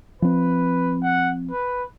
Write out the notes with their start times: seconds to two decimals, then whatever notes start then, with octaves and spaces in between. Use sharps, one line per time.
0.22 F3 C4 B4
1.03 F#5
1.51 B4